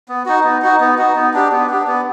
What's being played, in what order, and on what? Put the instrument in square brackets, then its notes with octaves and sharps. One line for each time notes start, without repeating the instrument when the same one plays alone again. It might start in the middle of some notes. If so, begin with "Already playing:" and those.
[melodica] B3
D#4 F#4
B3
D#4 F#4
B3
D#4 F#4
B3
D4 G4
B3
D4 G4
B3